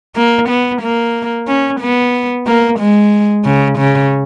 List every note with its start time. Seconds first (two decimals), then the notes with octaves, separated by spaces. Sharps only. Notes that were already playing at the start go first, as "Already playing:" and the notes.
0.16 A#3
0.49 B3
0.82 A#3
1.48 C#4
1.81 B3
2.47 A#3
2.79 G#3
3.45 C#3
3.78 C#3